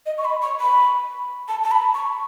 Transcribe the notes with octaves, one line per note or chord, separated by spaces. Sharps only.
D#5
C#6
B5
C#6
B5
A5
A5
B5
C#6